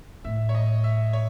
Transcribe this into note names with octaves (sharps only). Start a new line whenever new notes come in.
A2 E5
C#5
D#5
E5
C#5